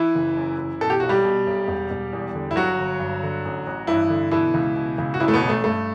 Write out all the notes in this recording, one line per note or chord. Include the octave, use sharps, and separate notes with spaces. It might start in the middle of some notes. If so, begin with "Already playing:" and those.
Already playing: E3 E4
F#1
F#2
E3
B2 A4
G4
B1 F#4
G3 G4
B2
B1
E1
E1
E2
D3
E4
G1 F#3 F#4
G1
G2
D3
A1
A1
G2 E3 E4
D3
B2 E3 E4
C#2
B2
C#2
F#4
A1 E3 E4
A3
B2 B3
A1
A3
G2 A3